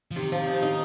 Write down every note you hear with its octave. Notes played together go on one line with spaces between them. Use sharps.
F3
C3 D#3
F3
D#4
D#4